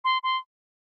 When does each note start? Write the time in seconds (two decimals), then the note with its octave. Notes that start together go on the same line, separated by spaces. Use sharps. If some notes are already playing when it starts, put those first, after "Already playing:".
0.04 C6
0.23 C6